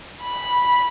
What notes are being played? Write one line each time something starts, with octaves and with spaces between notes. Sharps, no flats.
B5